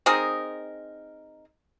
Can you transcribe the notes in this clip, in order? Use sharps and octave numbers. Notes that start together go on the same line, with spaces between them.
C4 D#4 G#4 A#4